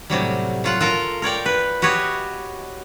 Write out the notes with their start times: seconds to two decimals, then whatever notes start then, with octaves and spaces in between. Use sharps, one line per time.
0.10 A2 C3 F#3 G3
0.64 F#3 F4 F#5
0.81 F4 A4 A#4
1.22 A#4 C#5 D5 G5
1.46 B4
1.82 F#4 G4 B4 C#5 D#5